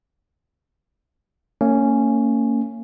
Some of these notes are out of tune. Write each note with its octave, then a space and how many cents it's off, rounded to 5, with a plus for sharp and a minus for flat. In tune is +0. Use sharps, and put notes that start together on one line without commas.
A#3 -35 C#4 +0